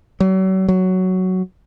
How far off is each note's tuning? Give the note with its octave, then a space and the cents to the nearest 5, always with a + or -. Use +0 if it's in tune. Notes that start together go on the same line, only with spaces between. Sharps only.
F#3 +40
F#3 +5